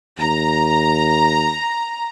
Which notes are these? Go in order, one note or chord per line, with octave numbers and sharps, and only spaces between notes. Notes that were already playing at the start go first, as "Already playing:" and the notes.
D#2 A#5